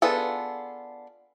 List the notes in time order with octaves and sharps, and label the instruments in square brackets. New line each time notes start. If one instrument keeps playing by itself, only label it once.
[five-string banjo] B3 D4 F4 G#4 A4